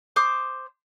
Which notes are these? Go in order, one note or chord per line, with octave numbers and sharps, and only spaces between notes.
C5 D6 D#6